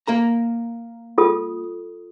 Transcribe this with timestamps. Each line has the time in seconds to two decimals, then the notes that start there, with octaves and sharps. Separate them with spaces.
0.08 A#3 A#4 A#5
1.18 F4 A4 D#6